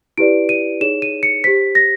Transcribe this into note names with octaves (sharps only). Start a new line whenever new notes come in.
E4 G4 B4 D5 D7
D#7
D#4 G#4 C#5 E7
D#7
C#7
G4 C5 B6
A#6